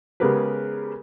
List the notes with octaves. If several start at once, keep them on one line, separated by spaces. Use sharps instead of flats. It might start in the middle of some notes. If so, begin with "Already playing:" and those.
C#3 G#3 B3 G4 A#4 B4